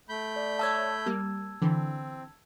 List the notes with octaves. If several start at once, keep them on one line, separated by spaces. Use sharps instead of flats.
A3 B5 G6
D5
C#5 D5 E5 A5 E6 G#6
G3 A#3
D3 E3 C4